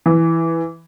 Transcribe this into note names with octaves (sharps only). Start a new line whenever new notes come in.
E3